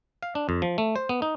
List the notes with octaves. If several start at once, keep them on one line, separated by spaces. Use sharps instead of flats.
F5
D4
F2
F3
A3
C5
B3
D#4